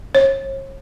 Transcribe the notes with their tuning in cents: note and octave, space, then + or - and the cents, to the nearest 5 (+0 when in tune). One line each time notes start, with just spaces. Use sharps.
C#5 -40